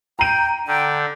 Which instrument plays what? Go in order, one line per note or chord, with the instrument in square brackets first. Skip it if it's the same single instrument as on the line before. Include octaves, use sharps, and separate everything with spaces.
[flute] G5 [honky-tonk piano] A#5 D#7
[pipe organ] D3 [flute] G5